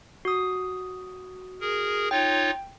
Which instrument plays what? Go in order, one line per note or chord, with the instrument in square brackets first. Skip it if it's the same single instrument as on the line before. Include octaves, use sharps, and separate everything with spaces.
[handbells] F#4 D#6
[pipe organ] G#4 A#4
[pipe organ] D#4 F4 C#5 [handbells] G5